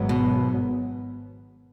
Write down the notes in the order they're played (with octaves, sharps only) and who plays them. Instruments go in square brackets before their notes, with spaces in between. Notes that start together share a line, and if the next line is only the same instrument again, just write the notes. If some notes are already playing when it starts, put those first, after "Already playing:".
Already playing: [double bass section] G#1 G#2 F#3 B3
[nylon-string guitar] B2